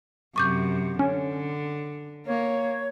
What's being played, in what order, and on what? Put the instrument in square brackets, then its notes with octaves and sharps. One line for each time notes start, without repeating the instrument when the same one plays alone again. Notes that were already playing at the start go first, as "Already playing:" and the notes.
[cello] F#2 C3 [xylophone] C#6 D6 G6
[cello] D3 [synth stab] C#4
[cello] A#3 [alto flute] C#5